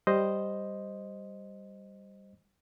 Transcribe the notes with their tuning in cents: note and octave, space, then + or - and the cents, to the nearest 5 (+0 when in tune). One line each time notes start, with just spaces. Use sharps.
G3 +0 C5 +0 D#5 +0